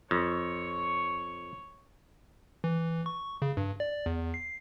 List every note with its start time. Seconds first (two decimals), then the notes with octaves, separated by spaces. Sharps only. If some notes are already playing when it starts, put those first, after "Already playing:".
0.11 F2 C#5 C#6
2.64 E3
3.06 C#6
3.42 C#3
3.57 G2
3.80 D5
4.06 E2
4.34 C7